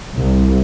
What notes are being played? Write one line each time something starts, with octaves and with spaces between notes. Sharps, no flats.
C2